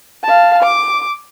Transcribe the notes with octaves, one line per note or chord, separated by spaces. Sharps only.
F5 A5
D6